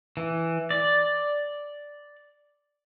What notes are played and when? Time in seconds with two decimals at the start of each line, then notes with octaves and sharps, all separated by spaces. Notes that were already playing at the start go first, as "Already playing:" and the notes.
0.17 E3
0.71 D5